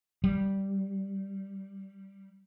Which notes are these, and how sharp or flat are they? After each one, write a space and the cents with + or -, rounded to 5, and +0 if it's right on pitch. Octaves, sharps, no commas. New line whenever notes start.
G3 -5